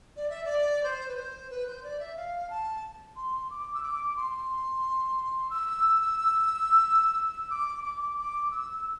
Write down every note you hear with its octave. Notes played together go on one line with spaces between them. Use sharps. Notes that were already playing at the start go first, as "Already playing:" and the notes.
D5
E5
D5
C5
B4
C5
B4
C5
D5
E5
F5
A5
C6
D6
E6
D6
C6
E6
D6
D6
D6
E6